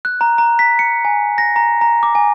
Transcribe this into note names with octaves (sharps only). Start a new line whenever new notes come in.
F#6
A#5
A#5
B6
C#7
G#5
A#6
A#5
A#5
D6
G#5